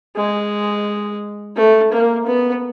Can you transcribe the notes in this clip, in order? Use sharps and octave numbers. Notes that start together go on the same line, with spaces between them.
G#3
A3
A#3
B3